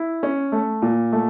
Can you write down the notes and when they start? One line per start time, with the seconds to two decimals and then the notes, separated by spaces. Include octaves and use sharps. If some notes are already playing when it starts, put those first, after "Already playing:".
Already playing: E4
0.23 C#4
0.52 A3
0.82 A#2
1.12 A3